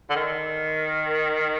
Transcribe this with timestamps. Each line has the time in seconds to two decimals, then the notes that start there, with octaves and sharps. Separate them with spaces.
0.10 D3
0.16 D#3